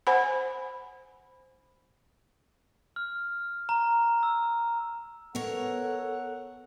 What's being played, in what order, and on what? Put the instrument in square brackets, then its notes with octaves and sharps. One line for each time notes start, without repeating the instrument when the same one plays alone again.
[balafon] C5 F#5 G#5 B5
[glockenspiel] F6
A#5
E6
[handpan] B3 [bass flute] A4 [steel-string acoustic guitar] A#4 C#5 [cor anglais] F#5